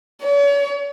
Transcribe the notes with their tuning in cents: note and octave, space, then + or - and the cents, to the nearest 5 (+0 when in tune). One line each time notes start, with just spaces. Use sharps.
C#5 +40